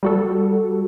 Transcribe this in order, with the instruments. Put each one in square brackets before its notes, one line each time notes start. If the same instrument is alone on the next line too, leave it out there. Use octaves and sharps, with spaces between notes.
[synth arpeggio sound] G3 F#4 A4